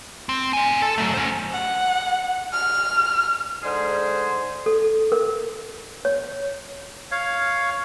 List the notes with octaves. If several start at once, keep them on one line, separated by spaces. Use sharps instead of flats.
C4
C4 G#5
A4
F#3 A3
C#4 C5
F#5
F6
G#2 D3 G#3 G#4 C5
A4
A#4
C#5
C#5 F5